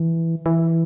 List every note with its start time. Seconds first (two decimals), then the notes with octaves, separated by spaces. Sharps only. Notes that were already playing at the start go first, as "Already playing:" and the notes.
Already playing: E3
0.46 E3